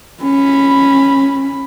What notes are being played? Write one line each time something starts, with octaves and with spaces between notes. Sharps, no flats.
C#4 B5